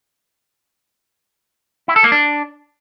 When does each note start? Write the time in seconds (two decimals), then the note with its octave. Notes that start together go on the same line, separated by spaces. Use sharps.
1.88 E4
1.96 A4
2.04 A#3
2.12 D4